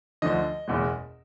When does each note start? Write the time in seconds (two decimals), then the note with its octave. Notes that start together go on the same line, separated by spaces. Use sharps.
0.22 D2 D3 F3 D#5
0.68 F#1 E2 B2 G#3